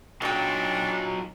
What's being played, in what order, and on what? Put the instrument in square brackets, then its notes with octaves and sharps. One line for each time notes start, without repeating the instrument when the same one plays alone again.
[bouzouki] A#2 G5 [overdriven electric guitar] F#3 D#4 [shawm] D4